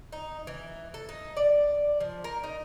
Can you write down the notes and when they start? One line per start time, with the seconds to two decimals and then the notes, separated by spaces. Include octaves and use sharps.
0.12 D#4
0.47 E3
0.94 A4
1.09 D#4
1.37 D5
2.00 F3
2.24 A#4
2.44 D#4